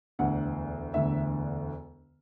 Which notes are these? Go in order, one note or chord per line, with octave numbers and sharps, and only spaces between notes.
E1 D2 D3 F#5
E1 D2 D3 E5